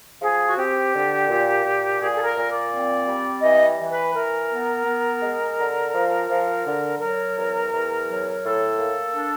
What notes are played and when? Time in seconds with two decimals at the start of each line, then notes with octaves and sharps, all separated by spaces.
0.21 F3 G#4
0.49 F#4
0.57 C4 G4
0.93 D3
1.30 A#2
1.64 A#2
2.00 A#2 G#4
2.16 A4
2.24 A#4
2.37 A#2
2.49 D5
2.72 C4
3.07 G3
3.43 E3 D#5
3.79 E3
3.91 B4
4.15 E3 A#4
4.50 B3
4.86 B3
5.22 G#3
5.58 D3
5.93 F3
6.30 F3
6.65 D3
7.00 F#3 A#4
7.37 E2
7.72 E2
8.07 F#3
8.44 A2 A4
8.79 A#3
9.14 D4